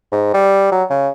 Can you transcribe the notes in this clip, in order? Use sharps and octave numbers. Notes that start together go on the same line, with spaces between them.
G#2
G3
F#3
C#3